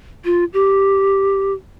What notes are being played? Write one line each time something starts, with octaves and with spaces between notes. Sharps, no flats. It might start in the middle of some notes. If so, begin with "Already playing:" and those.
F4
G4